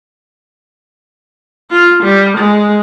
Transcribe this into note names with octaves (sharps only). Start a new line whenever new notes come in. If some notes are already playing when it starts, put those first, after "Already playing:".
F4
G3
G#3